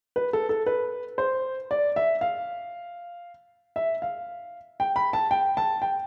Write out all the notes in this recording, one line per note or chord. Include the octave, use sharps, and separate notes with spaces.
B4
A4
A4
B4
C5
D5
E5
F5
E5
F5
G5
B5
A5
G5
A5
G5